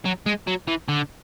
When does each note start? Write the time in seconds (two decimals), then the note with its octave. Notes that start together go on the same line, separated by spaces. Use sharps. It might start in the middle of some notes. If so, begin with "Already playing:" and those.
0.05 F#3
0.26 G#3
0.47 F#3
0.67 E3
0.88 D3